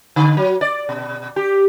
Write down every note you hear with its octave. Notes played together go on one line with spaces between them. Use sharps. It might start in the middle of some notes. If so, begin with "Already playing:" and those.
D3
F#3
D5
B2
G4